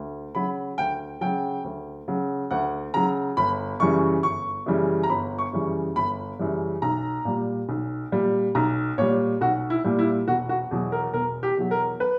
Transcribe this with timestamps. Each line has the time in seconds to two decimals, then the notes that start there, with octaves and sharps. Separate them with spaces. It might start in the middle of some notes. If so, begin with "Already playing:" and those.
Already playing: D2
0.35 C#3 F#3 B5
0.78 D2 G5
1.21 C#3 F#3 G5
1.64 D2
2.08 C#3 F#3
2.51 D2 F#5
2.94 C#3 F#3 A#5
3.37 G1 B5
3.80 F#2 C#3 E3 G3 C#6
4.23 G1 C#6
4.66 F#2 C#3 E3 G3
5.03 A#5
5.10 G1 B5
5.38 C#6
5.53 F#2 C#3 E3 G3
5.96 G1 B5
6.39 F#2 C#3 E3 G3
6.82 B1 A#5
7.25 A#2 G3
7.69 B1
8.12 A#2 G3
8.55 B1 A#5
8.98 A#2 G3 C#5
9.41 B1 F#4
9.70 E4
9.84 A#2 G3
9.99 E4
10.28 E1 F#4
10.49 F#4
10.71 E2 B2 F#3
10.92 A#4
11.13 E1 A#4
11.43 G4
11.57 E2 B2 F#3
11.71 A#4
12.00 B4